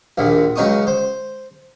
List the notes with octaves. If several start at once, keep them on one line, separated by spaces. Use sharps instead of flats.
A#1 D#2 A#2
C#2 F#3 C#4 D#4 C#6 D#6
C5